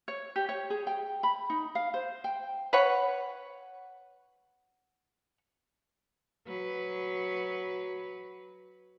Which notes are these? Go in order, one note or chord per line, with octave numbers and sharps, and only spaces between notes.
C#5
G4
C#5
G#4
G5
B5
D#4
F5
C5
G5
B4 C#5 F#5
F#3 B4